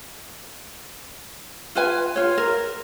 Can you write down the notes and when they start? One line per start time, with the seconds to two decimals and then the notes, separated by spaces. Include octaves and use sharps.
1.75 F4 B4 G#5
2.16 F4 C#5
2.38 A#4